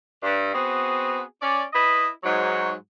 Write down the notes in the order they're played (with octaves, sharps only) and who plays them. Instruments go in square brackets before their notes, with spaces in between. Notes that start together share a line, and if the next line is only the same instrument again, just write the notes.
[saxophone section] G2
B3 C4 F#4 G#4
C#4 D5
E4 B4 D#5
G#2 F#3